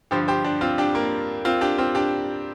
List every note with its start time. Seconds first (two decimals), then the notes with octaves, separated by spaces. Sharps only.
0.11 G2 D3 F3 G4 C5
0.28 G4 C5
0.45 D4 G4
0.61 C4 F4
0.78 D4 G4
0.95 A#3
1.45 C4 F4
1.61 D4 G4
1.78 C4 F4
1.95 D4 G4